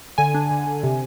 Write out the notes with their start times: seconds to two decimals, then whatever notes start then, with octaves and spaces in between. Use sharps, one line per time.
0.18 D3 G#5
0.34 D4
0.51 D3
0.66 D3
0.83 C3